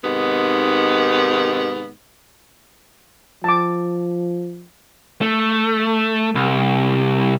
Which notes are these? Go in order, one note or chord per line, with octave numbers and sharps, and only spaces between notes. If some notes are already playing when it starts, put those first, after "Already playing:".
G#2 C3 D#3 B3
F3 A5 D6
A3
C2